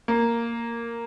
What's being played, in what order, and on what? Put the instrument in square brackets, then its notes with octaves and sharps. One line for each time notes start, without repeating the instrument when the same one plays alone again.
[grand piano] A#3